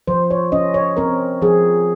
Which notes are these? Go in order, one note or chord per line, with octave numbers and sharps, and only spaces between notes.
F3 C5
C#5
C#4 D#5
C#5
C4 A#4
F3 G#4